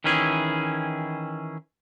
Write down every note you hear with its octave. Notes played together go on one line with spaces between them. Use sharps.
D#3 E3 C#4 E4 G#4